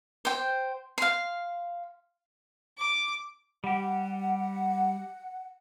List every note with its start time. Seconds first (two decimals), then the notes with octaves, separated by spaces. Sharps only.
0.25 C5 G5
0.98 F5 C6
2.78 D6
3.64 G3 G4 F#5